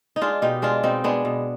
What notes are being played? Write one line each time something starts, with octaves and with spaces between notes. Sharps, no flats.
D#4
G#3 D4 F4
B2 D#4 G4
G#3 D4 F4
B2 C4 D#4
G#3 B3 D4
B2